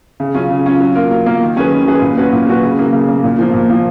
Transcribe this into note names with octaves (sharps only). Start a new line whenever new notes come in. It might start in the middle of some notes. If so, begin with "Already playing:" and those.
C#3
F#3 C#4 F4
C#3
F#3 C#4 F4
F#3
A#3 F4 A#4
F#3
A#3 F4 A#4
D#3
F#3 C#4 G#4 B4
D#3
F#3 C#4 G#4 B4
A#2
F#3 C#4 F#4 B4
A#2
F#3 C#4 F#4 B4
C#3
F#3 A#3
C#3
F#3 A#3
A#2
F3 A#3
A#2
F3 A#3